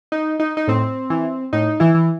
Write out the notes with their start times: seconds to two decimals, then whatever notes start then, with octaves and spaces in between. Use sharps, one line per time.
0.12 D#4
0.40 D#4
0.57 D#4
0.68 A2 C4
1.10 E3
1.53 A2 D#4
1.80 E3 E4
1.95 E3